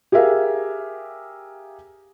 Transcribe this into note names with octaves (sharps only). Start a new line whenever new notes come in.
G4 G#4 A#4 E5 F5